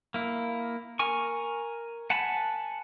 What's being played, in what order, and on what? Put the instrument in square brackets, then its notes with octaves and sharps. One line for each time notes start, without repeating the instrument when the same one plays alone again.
[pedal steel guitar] A#3 E4
A#4 G#5 C#6
F#5 G#5 A5 B5